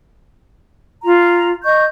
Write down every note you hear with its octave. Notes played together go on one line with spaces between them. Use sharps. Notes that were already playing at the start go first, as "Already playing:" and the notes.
F4 A#5
D#5 C#6 G6